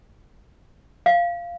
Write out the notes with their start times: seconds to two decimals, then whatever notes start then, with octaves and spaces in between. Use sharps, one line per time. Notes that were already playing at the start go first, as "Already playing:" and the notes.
1.06 F5